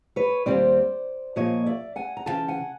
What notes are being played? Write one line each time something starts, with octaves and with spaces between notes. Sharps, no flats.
B4 C#5
D#2 D#3 G3 C4 C5 D5
A#2 F3 A#3 C#5 D#5
D5 E5
F#5 G#5
A#5
D#2 C#3 E3 G5 A5
F#5 G#5